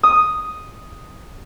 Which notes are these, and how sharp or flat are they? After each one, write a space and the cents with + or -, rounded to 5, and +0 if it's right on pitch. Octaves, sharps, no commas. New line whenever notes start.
D#6 +0